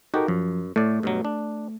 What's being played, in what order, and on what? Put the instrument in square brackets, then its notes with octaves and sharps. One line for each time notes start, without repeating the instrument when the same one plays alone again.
[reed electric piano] D#4 A4 A#4 [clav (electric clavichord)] F#4 G4
[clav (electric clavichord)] F#2 [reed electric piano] F3
[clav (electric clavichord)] A2 D5 [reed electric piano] A3
[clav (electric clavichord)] G2 B2 F#3
D4